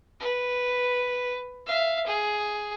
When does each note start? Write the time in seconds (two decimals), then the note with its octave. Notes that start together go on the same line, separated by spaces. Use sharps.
0.19 B4
1.67 E5 F5
2.06 G#4